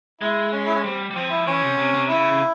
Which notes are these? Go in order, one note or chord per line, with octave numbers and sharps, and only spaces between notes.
G#3 E4
C#4
E4
C#4
G3 C4
G3
F3 C4
E4
E3 C#4
C3
C3
C3
C#3 E4